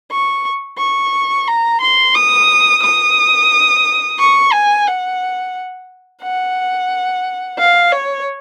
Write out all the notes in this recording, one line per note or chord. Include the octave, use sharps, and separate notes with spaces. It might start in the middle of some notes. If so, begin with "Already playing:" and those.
C#6
C#6
A#5
C6
D#6
D#6
C#6
G#5
F#5
F#5
F5
C#5